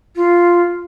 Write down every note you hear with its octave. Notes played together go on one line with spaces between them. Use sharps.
F4